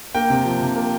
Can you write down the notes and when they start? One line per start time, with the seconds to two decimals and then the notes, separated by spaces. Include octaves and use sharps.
0.15 A#3 G5
0.30 C3
0.45 F3
0.61 C3
0.76 A#3